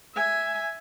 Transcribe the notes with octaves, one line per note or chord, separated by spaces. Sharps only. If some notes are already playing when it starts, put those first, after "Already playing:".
E5 G#5